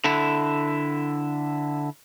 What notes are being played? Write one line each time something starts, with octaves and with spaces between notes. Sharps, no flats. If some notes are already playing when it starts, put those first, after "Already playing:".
D3 E4